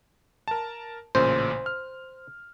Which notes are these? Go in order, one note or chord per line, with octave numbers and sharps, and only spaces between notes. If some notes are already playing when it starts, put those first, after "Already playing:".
A#4 A5
A1 A#2 C#3 C5
F6